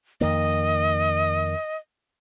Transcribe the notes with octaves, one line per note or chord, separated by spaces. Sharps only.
F2 D#3 A#3 D#5